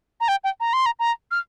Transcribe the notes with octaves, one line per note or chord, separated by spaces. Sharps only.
A#5
G5
G5
A#5
C6
A#5
A#5
F6